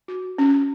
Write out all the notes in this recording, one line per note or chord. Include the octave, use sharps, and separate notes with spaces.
F#4
C#4